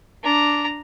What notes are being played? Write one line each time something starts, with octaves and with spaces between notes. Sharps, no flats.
D4 A#5